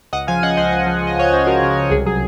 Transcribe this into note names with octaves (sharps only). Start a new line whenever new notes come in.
C#2 D#5 F#5
F3 F5 G#5
C#3 D#5 F#5
C#2 C5 D#5
C#2
F3
C#3
D#5
C#2 C#5
C#2 C5
F3 F#4 A#4
C#3
C#2
C2 G#4
F#3 G#4